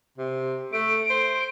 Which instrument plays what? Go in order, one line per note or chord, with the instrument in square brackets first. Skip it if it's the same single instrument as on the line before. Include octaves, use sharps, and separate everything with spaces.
[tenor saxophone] C3
[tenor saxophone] A3 [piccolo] D7
[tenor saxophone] C5